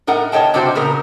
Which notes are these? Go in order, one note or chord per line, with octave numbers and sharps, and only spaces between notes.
A2 D#4 A#4 F#5
B2 C#5 D#5 G5 A5
G2 C3 G3 F#4 G4 C5
A#2 C#3 B3 A#4